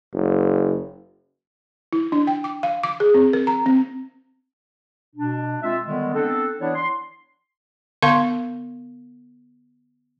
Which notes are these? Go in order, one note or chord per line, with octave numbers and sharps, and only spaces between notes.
F#1
E4
D4
G5
D6
F5
D6
G#4
C4
A#4
A#5
C4
B2 D4
G#3 C4 F4 E5
D3 D#3 G3 G#3 B3
B3 C4 D4 A4
E3 B3 D4 E4 C#5 D5
C6
D3 B3 F5 C6 C#6